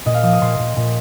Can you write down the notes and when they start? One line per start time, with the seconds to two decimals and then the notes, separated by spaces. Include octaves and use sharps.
0.05 A#2 D#5
0.14 F5
0.23 F3 D#6
0.33 D#6
0.41 A#2 C6
0.59 A#2
0.76 A#2